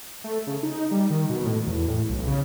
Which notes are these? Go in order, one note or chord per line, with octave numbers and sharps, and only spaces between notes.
A3
C#3
D#4
G3
D#3
B2
A2
E2
A2
B1
C#3